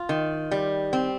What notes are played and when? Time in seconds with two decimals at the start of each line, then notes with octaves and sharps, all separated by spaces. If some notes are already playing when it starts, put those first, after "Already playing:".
Already playing: F4
0.09 D#3
0.51 G3
0.93 C4